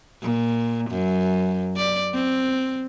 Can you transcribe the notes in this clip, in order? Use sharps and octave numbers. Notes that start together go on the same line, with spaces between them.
A#2
F#2
D5
C4